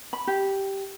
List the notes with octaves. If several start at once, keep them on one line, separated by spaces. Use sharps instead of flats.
B5
G4